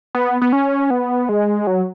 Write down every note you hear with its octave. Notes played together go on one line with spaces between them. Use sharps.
B3
B3
C#4
B3
G#3
F#3